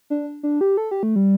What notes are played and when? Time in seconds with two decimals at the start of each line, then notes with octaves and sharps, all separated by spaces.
0.10 D4
0.43 D4
0.61 G4
0.77 A4
0.91 G4
1.03 A3
1.16 G3